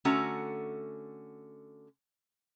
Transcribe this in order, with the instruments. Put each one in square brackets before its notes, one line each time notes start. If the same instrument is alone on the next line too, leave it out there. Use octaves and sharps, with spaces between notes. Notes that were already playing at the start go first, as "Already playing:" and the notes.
[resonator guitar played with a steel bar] D3 A3 C#4 F#4 A4 A#5